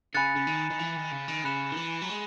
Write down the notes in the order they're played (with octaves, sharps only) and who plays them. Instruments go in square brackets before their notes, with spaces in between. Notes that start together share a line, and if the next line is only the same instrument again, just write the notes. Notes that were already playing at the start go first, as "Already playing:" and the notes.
[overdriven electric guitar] C#3 [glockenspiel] G#5 B5 F#6 A6 C#7
[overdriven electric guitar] C#3
D#3
D#3
E3
D#3
C#3
D#3
[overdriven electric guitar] C#3 [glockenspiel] B5 F#6 C#7 E7
[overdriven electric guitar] D#3
E3
F#3
G#3